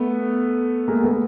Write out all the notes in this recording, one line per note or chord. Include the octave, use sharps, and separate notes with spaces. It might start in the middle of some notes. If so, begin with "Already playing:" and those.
Already playing: A3 B3
G#3 A#3
A3 B3